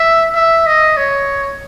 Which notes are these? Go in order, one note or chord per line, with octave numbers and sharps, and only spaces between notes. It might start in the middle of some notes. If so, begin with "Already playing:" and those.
Already playing: E5
E5
D#5
C#5